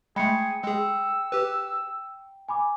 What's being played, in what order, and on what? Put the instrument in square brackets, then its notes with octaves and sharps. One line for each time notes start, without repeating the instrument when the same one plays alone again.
[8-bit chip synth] G#3 A3 [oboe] G#4 [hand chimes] G5 [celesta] B5 C#7
[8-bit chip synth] G#3 G#4 [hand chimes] G5 [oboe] E6
[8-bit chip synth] G4 B4
[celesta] G#5 B5 D6